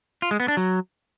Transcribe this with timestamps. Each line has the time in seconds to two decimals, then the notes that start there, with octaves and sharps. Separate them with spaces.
0.22 F4
0.31 G#3
0.40 B3
0.48 D4
0.57 F#3